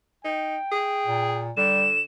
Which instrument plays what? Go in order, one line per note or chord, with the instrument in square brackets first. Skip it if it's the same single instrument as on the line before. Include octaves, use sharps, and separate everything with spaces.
[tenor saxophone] D#4 [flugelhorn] G5
[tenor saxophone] G#4
[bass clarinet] A#2
[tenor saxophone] D3 [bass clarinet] G3 [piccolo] E7